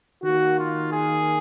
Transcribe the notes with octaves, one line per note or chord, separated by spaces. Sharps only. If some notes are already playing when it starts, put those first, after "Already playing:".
D#3 A#3 F#4
F4
G#4